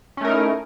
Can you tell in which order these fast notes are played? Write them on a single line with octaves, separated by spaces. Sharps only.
C#4 A3 A#4 D#4 E4